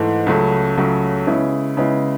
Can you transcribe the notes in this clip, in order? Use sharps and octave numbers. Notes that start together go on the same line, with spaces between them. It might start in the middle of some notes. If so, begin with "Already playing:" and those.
Already playing: G#2 E3 A3
C#2 C#3 F#3 A3
C#2 C#3 F#3 A3
C#3 G#3 B3 E4
C#3 G#3 B3 E4